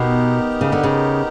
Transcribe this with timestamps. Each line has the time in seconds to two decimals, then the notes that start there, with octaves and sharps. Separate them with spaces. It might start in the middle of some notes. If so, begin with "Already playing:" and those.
Already playing: B2 B3 D#4 G4 A#4
0.61 C#3
0.72 D3
0.83 C#3